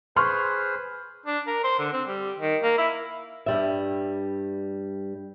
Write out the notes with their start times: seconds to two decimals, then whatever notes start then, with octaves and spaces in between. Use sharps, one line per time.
0.16 G#4 B4 C5 C6 C#6 F6
1.26 D4
1.47 A#4
1.64 C5
1.79 D3
1.93 C4
2.08 G3
2.38 D#3
2.63 A#3
2.78 E4
3.46 G2 G3 E5